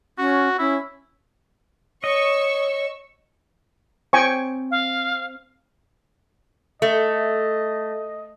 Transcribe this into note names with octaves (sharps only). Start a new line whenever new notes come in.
C#4 F#4
C#4 E4
C#5 D#5 C#6 E6
C4 G5 G#5 C#6
F5
A3 D#5